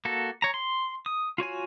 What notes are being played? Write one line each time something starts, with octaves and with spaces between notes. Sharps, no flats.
A#3 F#4 A4
C#5 A#5
C6
D#6
F4 F#4 C#5 G#5